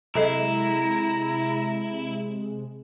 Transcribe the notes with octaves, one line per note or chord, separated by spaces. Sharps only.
C3 F#3 G#3 E4 A4 D#5 A#5